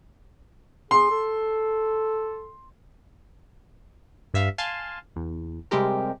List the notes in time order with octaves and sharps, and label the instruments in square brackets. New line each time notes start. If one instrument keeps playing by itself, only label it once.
[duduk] G#4 [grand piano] C6
[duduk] A4
[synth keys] G2 E5 F5
F5 G#5 A5 C6
E2
C3 G3 G#3 C4 G4 A#4